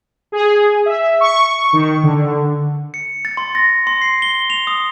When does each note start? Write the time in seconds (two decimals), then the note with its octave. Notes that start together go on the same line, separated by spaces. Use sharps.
0.32 G#4
0.86 E5
1.20 C#6
1.73 D#3
2.03 D3
2.94 C#7
3.25 A6
3.37 C6
3.55 A#6
3.87 C6
4.02 C7
4.22 G7
4.50 F7
4.67 D#6